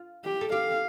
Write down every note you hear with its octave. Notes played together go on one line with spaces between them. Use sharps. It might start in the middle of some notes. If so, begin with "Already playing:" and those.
Already playing: F4
G4
A4
G4 F5